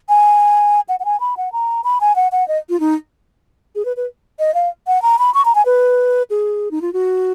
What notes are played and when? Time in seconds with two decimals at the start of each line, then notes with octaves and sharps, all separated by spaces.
0.09 G#5
0.89 F#5
1.00 F#5
1.05 G#5
1.20 B5
1.37 F#5
1.52 A#5
1.84 B5
2.01 G#5
2.16 F#5
2.32 F#5
2.48 D#5
2.69 F4
2.80 D#4
3.75 G#4
3.85 B4
3.96 B4
4.39 D#5
4.54 F5
4.87 F#5
5.02 A#5
5.19 B5
5.34 C#6
5.45 A#5
5.55 G#5
5.65 B4
6.30 G#4
6.71 D#4
6.82 F4
6.93 F#4